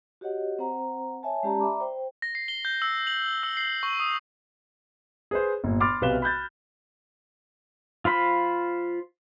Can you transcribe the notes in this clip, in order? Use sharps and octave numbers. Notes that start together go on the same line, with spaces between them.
F#4 G4 C#5 D#5 F#5
C4 C5 F#5 A#5
C#5 E5 G#5 A5
G#3 C#4 G4 D5 A5 A#5
D5 E5 A#5 B5 D6
C5 G5
A#6
C7
G7
G6
E6
F#7
E6
C7
C#6
D#6
G#4 B4 C5
G1 A#2
B5 C6 D6 F6 A6
B1 C3 B4 F5 E7 G7
B5 F#6 G6 A6
F4 C5 B5